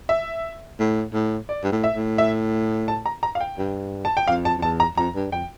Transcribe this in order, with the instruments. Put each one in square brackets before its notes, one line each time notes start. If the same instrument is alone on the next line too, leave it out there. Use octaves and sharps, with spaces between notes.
[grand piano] E5
[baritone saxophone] A2
A2
[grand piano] D5
[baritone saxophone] G2
A2
[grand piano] E5
[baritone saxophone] A2
[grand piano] E5
A5
A#5
A#5
F5
G5
[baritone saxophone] G2
[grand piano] A5
G5
[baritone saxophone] F2 [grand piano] F5
[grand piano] A5
[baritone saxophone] F2
[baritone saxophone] E2 [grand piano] A5
[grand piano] A#5
[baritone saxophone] F2 [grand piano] A#5
[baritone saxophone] G2
[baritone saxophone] F2 [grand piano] G5